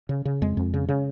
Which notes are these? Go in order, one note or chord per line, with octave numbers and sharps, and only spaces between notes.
C#3
C#3
F2 G#3
F2
C#3
C#3